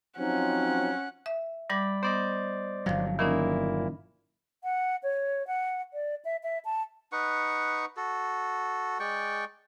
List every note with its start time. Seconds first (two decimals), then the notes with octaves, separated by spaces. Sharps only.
0.19 F3 F#3 C4 C#4 D#4 F#5
1.26 E5
1.70 G3 D5 B5 D6 G6
2.03 B3 C5 D5 D#5
2.86 G1 C2 F3 F#3 F5
3.19 A#2 D#3 A#3 C#4 D#4 E4
4.64 F#5
5.03 C#5
5.47 F#5
5.94 D5
6.25 E5
6.43 E5
6.65 A5
7.12 D#4 B4 F#5 C#6
7.97 F#4 A4
9.00 G#3 D5 G5 C#6